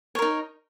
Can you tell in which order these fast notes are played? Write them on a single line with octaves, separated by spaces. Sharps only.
C#5 A#4 D#4